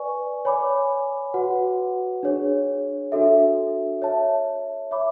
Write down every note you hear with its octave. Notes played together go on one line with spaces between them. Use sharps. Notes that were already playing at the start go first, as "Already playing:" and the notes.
Already playing: B4 D5 G#5 C#6
C#5 G#5 B5 D6
F#4 B4 F#5
D4 G#4 C#5
D4 F#4 A4 E5
C#5 E5 A5
C#5 E5 B5 D6